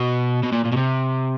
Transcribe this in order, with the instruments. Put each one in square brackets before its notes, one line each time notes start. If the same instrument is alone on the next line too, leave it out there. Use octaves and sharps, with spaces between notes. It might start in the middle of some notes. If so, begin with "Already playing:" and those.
Already playing: [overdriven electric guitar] B2
B2
A#2
A#2
B2
C3